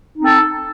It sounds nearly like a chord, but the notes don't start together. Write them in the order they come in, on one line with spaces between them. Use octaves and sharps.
D#4 C4 A4